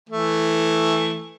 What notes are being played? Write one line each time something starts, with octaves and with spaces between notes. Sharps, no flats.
E3 A3